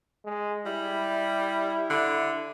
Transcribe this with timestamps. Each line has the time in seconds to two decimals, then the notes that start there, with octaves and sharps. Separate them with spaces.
0.24 G#3
0.66 G3 E4
1.90 D3